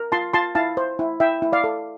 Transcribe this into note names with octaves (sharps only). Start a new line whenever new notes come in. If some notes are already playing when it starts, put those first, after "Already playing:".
Already playing: A#4
F4 A5 C6
F4 A5 C6
E4 F5 A5
C5
E4
E4 E5 G5
E4
D5 F5
A4